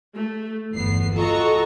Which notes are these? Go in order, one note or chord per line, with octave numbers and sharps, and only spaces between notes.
A3
G1 E2 B3 C7
F4 F#4 A4 D#5 A#5 C#6